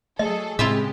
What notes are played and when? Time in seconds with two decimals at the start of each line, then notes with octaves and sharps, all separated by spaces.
0.19 F#3 A3 G#4 A4 D#5
0.59 C#2 A2 G#3 C4 E4 F4 G4 E5